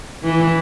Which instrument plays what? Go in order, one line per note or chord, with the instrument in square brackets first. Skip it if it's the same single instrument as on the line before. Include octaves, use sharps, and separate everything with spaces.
[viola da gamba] E3